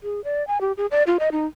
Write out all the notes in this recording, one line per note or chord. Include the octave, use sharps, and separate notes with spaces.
G#4
D5
G#5
G4
G#4
D5
F4
D#5
D#4